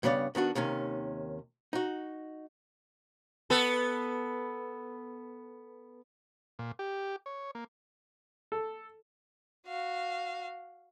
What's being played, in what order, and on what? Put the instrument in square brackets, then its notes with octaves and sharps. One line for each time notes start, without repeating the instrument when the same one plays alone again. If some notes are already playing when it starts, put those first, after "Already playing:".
[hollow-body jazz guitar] G2 C#3 B3 C#5 D5
D#3 B3 D4 F#4
D#2 C3 D#3 C#4
D#4 F#4
[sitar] B3 A4
[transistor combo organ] A#2
G4
C#5
A#3
[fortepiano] A4
[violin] F#4 F5